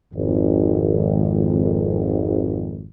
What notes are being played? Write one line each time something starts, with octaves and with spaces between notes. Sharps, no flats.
G#1 F2